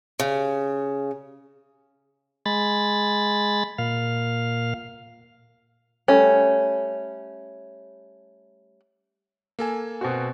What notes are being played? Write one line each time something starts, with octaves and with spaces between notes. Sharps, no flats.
C#3
G#3 B5 A6
A#2 F5
G3 A3 C#4
A#3 A4 G#5
B2 C4 F#4